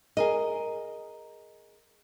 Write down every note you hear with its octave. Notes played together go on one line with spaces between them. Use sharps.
G#4 A#4 D#5